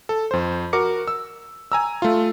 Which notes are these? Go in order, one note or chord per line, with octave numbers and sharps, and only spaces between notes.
A4
F2 C5
F#4 A#4 D6 C#7
E6
G#5 A#5 E6
A3 F4